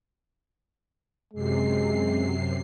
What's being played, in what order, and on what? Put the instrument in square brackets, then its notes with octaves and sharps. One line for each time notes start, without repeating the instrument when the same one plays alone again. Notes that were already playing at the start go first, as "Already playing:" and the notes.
[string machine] F#2 C3 C7 [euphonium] G#3